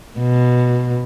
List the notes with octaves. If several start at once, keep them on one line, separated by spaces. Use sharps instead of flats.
B2